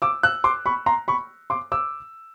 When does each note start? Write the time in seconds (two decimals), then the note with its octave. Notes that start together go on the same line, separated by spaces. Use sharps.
0.02 D6 E6
0.23 E6 F#6
0.44 C6 D6
0.66 B5 C#6
0.86 A#5 C6
1.08 B5 C#6
1.50 C6 D6
1.72 D6 E6